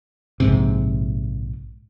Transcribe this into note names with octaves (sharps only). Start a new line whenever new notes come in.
A#1 G#2 C3